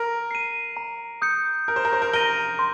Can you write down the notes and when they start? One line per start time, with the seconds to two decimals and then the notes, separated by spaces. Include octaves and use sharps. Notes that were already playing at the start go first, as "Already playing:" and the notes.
Already playing: A#4
0.31 C7 D#7
0.77 A#5
1.22 D#6 G6 C#7
1.68 A#4 G6
1.76 C5
1.85 A#4
1.93 C5
2.02 A#4
2.13 A#4 A#6 D#7 G7
2.59 C6